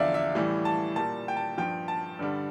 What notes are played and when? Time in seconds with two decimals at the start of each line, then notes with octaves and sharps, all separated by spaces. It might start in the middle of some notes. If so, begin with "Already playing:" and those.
Already playing: E2 D3 F3 D5 E5 F5
0.14 E5
0.35 A2 E3 G3
0.65 A5
0.96 A#2 G3 A5
1.28 G5
1.37 A5
1.57 G2 F3 G5
1.88 A5
2.19 G2 D3 G3